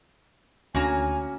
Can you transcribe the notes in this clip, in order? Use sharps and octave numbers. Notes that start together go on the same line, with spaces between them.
D2 D3 A#3 C#4 F#4 G#5 A#5